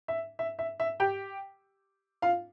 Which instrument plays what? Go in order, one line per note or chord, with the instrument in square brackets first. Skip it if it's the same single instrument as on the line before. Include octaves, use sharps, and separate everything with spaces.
[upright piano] E5
E5
E5
E5
G4 G5
F4 F5